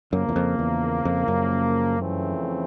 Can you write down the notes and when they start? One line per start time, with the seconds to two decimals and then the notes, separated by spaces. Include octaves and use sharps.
0.12 F#2 C#3 F3 A#3
0.29 E2
0.36 F2
0.59 E2
1.05 F2
1.28 F#2
1.97 F2 C#3 E3 A3 C4